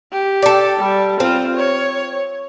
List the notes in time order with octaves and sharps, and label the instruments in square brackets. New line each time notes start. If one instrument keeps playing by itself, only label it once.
[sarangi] G4
[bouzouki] A4 D5
[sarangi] G3
[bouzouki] C4 [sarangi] F4
[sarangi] C#5